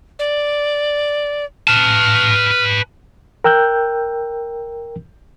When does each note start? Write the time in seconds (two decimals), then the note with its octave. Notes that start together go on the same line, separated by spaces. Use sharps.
0.19 D5
1.68 B4 A5 F6
3.44 A#4 G5 E6 F#6 G6